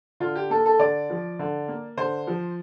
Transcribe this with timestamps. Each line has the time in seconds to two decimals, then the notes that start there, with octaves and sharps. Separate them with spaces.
0.20 D3 F4
0.35 G4
0.50 A#3 A4
0.66 A4
0.79 D3 D5
1.10 F3
1.39 D3
1.68 A#3
1.97 D3 C5
2.27 F3